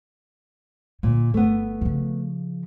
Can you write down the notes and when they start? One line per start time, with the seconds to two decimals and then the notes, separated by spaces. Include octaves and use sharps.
1.03 A#2 D3
1.34 G1 A3 B3
1.81 C#3 F3